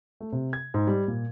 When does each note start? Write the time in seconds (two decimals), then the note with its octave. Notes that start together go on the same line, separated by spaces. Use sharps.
0.20 A3
0.32 C3
0.53 G#6
0.74 G#2
0.87 G3
1.08 A#2